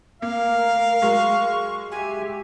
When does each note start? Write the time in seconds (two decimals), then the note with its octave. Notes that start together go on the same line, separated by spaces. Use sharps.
0.22 A3 A#3 A#4 F5
1.02 F#3 G#3 C#6
1.91 G4 E5 G#5